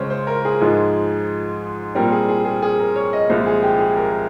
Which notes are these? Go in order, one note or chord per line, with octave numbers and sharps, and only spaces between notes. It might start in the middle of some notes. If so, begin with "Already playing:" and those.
Already playing: C#2 C#3 G#3 C5 C#5
C5
A#4
G#4
G#2 F3 G#3
A#2 G3 C4 A#4
G#4
G#4
G#4
G#4
A#4
C#5
D#5
C2 A#2 F3 G#3 C5
G#4
G4
G#4
A#4